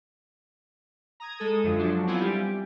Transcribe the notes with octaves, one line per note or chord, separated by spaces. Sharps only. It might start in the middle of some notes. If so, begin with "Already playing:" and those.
A#5 D#6 G#6
G#3 A4 D#6
F#2 D3 F3
F3 F#3 D4
B3 C4 E4 F4 G#5
G3 G4